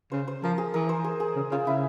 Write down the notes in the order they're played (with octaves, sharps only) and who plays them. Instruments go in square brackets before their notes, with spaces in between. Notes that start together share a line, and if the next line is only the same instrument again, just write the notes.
[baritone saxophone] C#3 [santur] C5
[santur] C5
[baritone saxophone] F3 [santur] A#4
[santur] G#4
[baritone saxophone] E3 [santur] A#4
[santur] C5
G#4
G#4
[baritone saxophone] C#3
[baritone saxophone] C#3 [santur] F4
[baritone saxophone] C#3 [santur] E4